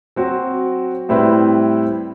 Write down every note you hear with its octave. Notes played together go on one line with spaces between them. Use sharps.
F#3 C4 F#4
A2 G3 C4 E4 B4